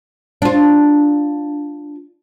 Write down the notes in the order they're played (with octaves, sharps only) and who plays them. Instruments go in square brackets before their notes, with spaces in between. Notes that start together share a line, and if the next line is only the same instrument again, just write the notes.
[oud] D4 F4